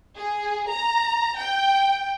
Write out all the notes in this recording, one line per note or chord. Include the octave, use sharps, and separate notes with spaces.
G#4
A#5
G5